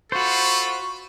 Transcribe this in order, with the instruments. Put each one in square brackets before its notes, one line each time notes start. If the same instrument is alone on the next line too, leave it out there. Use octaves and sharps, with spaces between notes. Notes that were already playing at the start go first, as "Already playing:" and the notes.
[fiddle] F4 B5 [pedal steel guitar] F#4 C5 [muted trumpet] A4 [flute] C#6